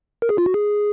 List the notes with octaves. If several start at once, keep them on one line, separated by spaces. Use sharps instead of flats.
A#4
G#4
F4
F#4
G#4